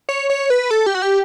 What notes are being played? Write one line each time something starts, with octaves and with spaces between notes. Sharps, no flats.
C#5
C#5
B4
A4
G4
F#4
G4